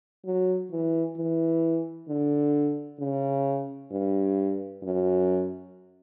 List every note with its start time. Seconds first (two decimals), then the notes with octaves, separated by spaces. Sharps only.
0.25 F#3
0.71 E3
1.17 E3
2.08 D3
2.99 C#3
3.91 G2
4.83 F#2